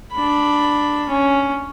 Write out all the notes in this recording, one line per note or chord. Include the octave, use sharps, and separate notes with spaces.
D4 B5
C#4